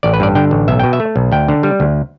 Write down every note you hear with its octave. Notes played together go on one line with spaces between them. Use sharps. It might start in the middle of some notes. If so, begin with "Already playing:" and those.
A1 D5
B4
G2 D5
D3 G5
A1
B1 E5
B2 G5
E5
A3
B1
D2 G5
D3
G3
D2